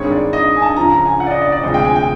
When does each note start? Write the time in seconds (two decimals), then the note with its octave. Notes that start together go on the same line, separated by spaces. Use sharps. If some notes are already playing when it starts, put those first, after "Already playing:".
Already playing: G2 D#3 G#3 C4 C#5
0.12 D5
0.33 D#5
0.56 G#5
0.62 A5
0.76 C#2 C#3 F3 A#5
0.91 A#5
1.06 G#5
1.20 F#5
1.26 D5
1.31 D#5
1.41 D5
1.52 D5
1.63 D2 C3 F3 G#3 D#5
1.74 G5
1.85 G#5
1.96 G5